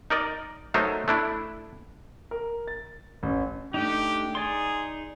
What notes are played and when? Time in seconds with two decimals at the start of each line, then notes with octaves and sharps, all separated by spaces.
0.10 D#4 A#4 D5 D#5
0.74 F#3 A3 D#4 A#4 C5
1.08 A3 D4 E4
2.31 A#4
2.68 A6
3.23 A1
3.74 A3 D4 D#4 G4
4.35 D#4 G#4 D5 C6